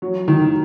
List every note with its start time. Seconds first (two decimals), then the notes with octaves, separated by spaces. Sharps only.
0.02 F#3
0.28 D#3